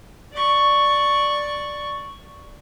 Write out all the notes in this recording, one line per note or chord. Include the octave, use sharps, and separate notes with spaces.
D5 C#6